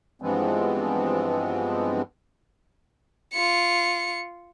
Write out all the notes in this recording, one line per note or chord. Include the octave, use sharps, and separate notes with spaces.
G2 E3 F3 G#3 B3 C4
F4 C#7